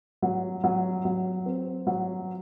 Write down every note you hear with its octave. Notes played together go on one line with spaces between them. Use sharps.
F#3
F#3
F#3
C4
F#3